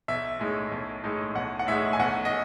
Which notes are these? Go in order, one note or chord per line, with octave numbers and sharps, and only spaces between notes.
B1 E5
A2 G#3 D#4
B1
A2 G#3 D#4
B1 F#5
F#5
A2 G#3 D#4 E5
G#5
B1 F#5
D#5